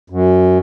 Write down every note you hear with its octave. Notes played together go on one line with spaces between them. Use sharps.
F#2